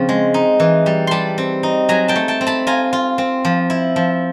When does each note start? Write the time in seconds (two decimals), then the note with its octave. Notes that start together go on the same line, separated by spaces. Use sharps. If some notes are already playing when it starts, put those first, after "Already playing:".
Already playing: C#3 F3 C4
0.09 G#3
0.34 D#4
0.60 E3
0.86 G3
1.07 G3 A5 B5 C6
1.38 C4
1.63 D#4
1.89 F#3 G#5 A#5
2.08 G5 A5
2.16 A3
2.28 G5 A5
2.41 C4
2.47 A5 B5
2.67 F4 G#5 A#5
2.93 F4
3.18 C4
3.45 F3
3.70 E4
3.96 F3